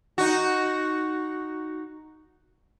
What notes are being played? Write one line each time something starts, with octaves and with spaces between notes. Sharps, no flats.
D#4 F#4